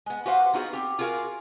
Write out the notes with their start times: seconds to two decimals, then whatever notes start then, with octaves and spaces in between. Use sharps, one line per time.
0.06 G#3 B3
0.26 F#4 G4 B4 C5 F5 F#5
0.53 B3 D#4 F4 F#4 G#4
0.73 C4 G4
0.99 F4 F#4 G#4 A#4 F5